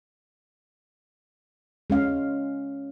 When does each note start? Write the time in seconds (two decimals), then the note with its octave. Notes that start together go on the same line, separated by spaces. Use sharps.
1.90 G#3 C#4 F5